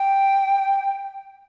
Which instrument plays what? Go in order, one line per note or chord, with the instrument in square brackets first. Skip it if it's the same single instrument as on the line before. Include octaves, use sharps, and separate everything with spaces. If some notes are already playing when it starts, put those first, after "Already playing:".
Already playing: [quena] G5